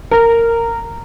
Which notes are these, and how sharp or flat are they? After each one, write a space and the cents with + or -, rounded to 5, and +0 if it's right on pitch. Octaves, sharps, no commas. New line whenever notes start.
A#4 -15